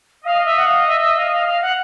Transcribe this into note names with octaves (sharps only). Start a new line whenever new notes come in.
D#5 F5
E5
F#5
F5
E5
E5
F5
F5
F5
F#5